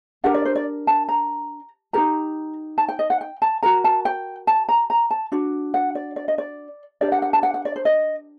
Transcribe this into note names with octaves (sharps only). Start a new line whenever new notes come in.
D4 G4 A#4 F#5
D5
C5
D5
A5
A#5
D#4 G4 A#4 A#5
A5
G5
D#5
F#5
G5
A5
F#4 A#4 A#5
A5
G5
A5
A#5
A#5
A5
D4 F#4
F#5
D5
D5
D#5
D5
D4 G4 A#4 D5
F#5
F#5
A5
F#5
F#5
D5
C5
D#5